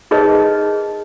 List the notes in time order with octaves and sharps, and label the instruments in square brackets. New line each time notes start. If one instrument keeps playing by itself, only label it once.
[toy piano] D#4 G#4 A#4 B4 C#5 D#5